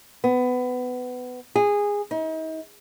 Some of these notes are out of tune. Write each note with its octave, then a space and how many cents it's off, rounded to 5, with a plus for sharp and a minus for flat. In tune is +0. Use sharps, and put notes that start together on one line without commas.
B3 +20
G#4 -15
D#4 +40